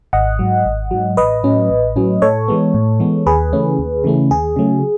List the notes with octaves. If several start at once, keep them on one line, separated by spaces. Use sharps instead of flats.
G#1 D#5 F#5
G#2 F#3
G#1
G#2 F#3
A1 B4 D#5
A2 F#3 C#4
A1
A2 F#3 C#4
A2 A4 C#5
E3 G#3 B3
A2
E3 G#3 B3
D#2 G#4 B4
C#3 E3 A3 C#4
D#2
C#3 E3 A3 C#4
D#2 G#4
C#3 F#3 A3